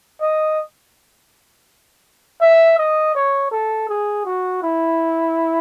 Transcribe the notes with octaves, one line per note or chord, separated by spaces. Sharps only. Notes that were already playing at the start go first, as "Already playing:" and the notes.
D#5
E5
D#5
C#5
A4
G#4
F#4
E4